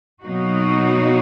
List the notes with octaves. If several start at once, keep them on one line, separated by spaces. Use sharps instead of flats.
B2 F#3 A#3 D#4 F#4